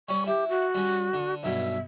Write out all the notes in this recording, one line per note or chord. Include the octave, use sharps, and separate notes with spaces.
G3 C#4 C#6
E4 G4
F#4
G3 C#4
D3
B1 G2 B2 E5